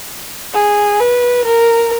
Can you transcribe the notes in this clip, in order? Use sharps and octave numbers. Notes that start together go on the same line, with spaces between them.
G#4
B4
A#4